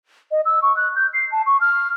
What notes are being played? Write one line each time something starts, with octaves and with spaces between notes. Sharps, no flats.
D#5
E6
C#6
F#6
G6
C7
A5
C#6
F6